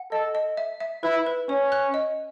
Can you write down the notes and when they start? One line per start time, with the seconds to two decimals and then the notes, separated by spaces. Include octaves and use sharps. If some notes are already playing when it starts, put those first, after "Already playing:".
Already playing: F#5
0.12 A4 D#5
0.35 D#5
0.57 E5
0.80 E5
1.03 E4 B4
1.27 B4
1.49 C#4 C#5
1.72 F#6
1.94 D#5